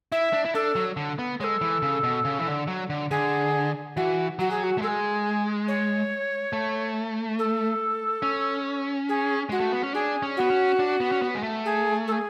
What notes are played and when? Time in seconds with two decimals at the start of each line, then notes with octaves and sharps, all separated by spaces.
0.11 E4 E5
0.33 D4
0.45 E4
0.54 D4 A4
0.75 F#3
0.97 D3
1.19 B3
1.40 G#3 A4 C#5
1.61 E3
1.82 C#3
2.03 B2
2.25 C#3
2.39 E3
2.47 D3
2.68 F#3
2.90 D3
3.10 D3 G#4
3.96 E3 F#4
4.39 F#3 F#4
4.50 G#4
4.63 F#4
4.78 A3
4.81 G#3 A4
4.87 G#4
5.68 C#5
6.53 A3
7.38 A4
8.22 C#4
9.08 G#4
9.49 G#3 F#4
9.60 A3
9.72 B3
9.83 C#4
9.94 D4 G#4
10.23 C#4
10.36 B3 F#4
10.50 C#4
10.79 D4
11.00 B3
11.12 C#4
11.22 B3
11.35 G#3
11.43 A3
11.65 G#4
12.07 A4
12.11 G#4